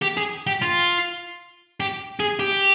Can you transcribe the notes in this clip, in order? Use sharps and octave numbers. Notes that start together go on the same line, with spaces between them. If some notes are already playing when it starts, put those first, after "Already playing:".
G4
G#4
G4
F4
G4
G#4
G4